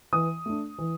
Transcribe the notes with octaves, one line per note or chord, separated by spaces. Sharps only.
E3 D#6
A3 D4
E3